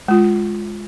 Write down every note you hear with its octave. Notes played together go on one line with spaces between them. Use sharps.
G#3 F4